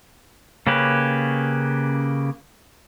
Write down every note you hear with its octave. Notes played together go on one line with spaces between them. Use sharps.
C#3 A#3 C#4 G4 B4